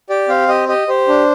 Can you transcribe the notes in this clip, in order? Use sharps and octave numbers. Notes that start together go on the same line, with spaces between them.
G4 D5
C4 F5
G4 D#5
G4 D#5
G4 C5
D4